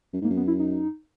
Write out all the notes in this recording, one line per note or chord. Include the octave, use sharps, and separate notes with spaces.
F#2
G#2 A#3
F#2
B3
E4
D#4